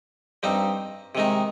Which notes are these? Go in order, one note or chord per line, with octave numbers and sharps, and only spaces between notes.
G2 G3 C4 D#4
C3 D#3 G#3 D#4